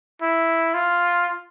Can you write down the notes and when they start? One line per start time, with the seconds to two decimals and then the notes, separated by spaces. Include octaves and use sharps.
0.21 E4
0.74 F4